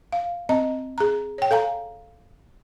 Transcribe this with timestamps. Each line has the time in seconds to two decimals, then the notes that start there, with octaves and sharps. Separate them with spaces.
0.12 F5
0.49 C4 D#5 A#5
0.98 G#4 A#5
1.38 C#5 G5
1.51 A4 F5 G#5 A#5